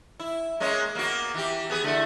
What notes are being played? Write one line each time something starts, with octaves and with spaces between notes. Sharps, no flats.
E4
G#3 A#3 C#4
A#3 B3 F#4
E3 G4
B3 G#4 B4
D3 A3 E4